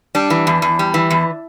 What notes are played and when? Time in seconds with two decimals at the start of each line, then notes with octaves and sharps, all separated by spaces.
0.15 G3 D4
0.30 E3
0.47 E2
0.62 E2
0.79 G3
0.94 E3
1.10 E2